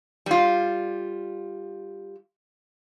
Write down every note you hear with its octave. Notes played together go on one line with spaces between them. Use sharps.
G3 F4